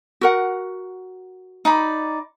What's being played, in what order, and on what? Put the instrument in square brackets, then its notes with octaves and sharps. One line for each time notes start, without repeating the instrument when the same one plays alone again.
[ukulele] F#4 A#4 F#5
[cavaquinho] D#4 D5 B5